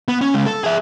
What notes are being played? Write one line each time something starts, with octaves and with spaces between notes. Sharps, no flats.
B3
C#4
C#3 G#3
A4
G#4 E5